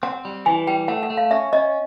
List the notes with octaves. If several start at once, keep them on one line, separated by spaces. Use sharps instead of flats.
C4 F#5
G3
E3 G#5
G3 G5
A3 F#5
F#5
A3
F5
C#4 E5
C#4 D#5